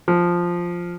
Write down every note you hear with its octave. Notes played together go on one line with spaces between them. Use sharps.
F3